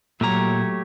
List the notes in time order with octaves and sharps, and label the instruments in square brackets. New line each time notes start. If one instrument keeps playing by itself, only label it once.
[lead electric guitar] A#2 A#5 [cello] F#3 [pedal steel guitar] A3 G4 C#5